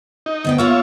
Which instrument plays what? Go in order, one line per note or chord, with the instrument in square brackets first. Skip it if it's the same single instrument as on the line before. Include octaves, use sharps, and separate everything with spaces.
[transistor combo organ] D#4
[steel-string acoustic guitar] D2 B3 G5
[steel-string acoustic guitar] A#3 F4 A#4 [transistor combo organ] C#5 E5 F5